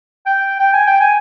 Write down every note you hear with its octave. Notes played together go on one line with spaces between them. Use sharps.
G5
G5
G#5
G5
G#5